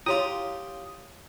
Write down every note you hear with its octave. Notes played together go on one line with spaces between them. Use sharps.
E4 F4 G4 C#5 G5 C6 D#6